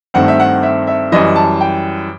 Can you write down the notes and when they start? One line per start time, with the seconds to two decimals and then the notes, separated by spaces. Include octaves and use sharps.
0.14 G2 D#3 A3 C4 F#5
0.28 E5
0.40 F#5
0.63 E5
0.87 E5
1.12 F#2 E3 G3 D#5
1.36 A5
1.61 G5